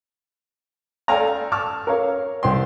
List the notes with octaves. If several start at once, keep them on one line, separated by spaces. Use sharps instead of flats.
A4 D5 F5 G5 G#5 A#5
A5 C#6 D6 E6 F6
A#4 C#5 F5
C2 C4 G5 C6